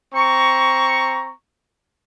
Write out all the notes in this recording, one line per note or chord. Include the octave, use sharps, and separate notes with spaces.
C4 A#5 C#6